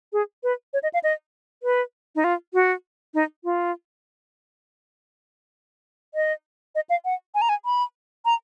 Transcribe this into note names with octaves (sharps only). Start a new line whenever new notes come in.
G#4
B4
C#5
D#5
F5
D#5
B4
D#4
F4
F#4
D#4
F4
D#5
D#5
F5
F#5
G#5
A#5
G#5
B5
A#5